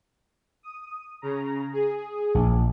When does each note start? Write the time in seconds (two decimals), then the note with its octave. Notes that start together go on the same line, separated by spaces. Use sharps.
0.63 D#6
1.22 C#3 A#5
1.73 G#4
2.35 A#1